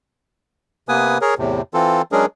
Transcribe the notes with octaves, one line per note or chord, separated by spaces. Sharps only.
C3 A#3 B3 B4 G#5 D#6
G#4 A#4 C#5
E2 A2 C3
E3 C4 F4 A4
F#3 G#3 C#4 D4 G#4 A#4